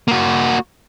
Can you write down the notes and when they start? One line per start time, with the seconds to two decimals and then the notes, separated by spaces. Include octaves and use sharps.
0.08 A#3 F#4